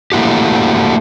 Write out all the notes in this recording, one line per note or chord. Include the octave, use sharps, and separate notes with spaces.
A3 A#3 E4 F#4 G4